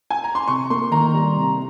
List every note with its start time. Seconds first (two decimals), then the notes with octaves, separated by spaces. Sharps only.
0.10 G#5
0.24 A#5
0.35 C6
0.48 C3 C#6
0.70 A#3 C6
0.91 D#3 A#5
1.14 G3
1.36 C3